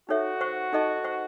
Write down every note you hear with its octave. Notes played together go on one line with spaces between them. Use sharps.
D#4 F#4 A4 C#5 E5
C5 F#5 C#6
D#4 A4 D#5 A5 C#6
C5 F#5 C#6